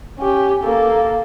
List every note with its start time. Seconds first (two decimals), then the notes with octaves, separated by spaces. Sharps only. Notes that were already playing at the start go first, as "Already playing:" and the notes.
0.18 C#4 G4
0.64 A#3 A4